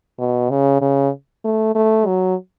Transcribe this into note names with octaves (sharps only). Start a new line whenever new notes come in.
B2
C#3
C#3
A3
A3
F#3